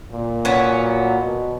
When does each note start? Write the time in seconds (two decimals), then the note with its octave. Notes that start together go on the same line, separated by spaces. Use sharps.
0.13 A#2
0.45 F#3 B3 C#4
1.19 B2